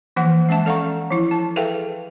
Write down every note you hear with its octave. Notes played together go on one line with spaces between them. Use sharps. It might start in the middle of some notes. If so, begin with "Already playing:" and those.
E3 F3 A#3 F#5
G#3 C#4 E5 A5
A4 D5 F5 F#5 A#5 C#6
F3 E4
A5
G#4 A4 B4 E5 F5 G5